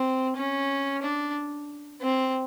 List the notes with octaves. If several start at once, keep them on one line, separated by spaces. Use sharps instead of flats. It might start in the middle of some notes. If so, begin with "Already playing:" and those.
Already playing: C4
C#4
D4
C4